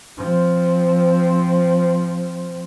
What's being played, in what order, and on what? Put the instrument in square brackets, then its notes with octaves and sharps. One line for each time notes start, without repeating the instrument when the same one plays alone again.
[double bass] F3 C4